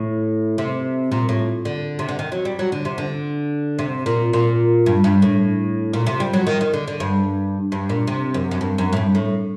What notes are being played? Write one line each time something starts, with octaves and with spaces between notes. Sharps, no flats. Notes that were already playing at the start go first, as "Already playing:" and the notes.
Already playing: A2
C3
A#2
A2
D3
C3
D3
D#3
F#3
G3
F#3
D3
C3
D3
C3
A#2
A#2
G2
G2
A2
A#2
C3
G3
F#3
D#3
D#3
D3
D3
G2
G2
A#2
C3
F#2
F#2
G2
F#2
A2
G2
A2